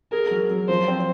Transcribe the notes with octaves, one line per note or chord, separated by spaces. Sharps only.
G#4 A#4
F#3
F#3
F3 C5
C4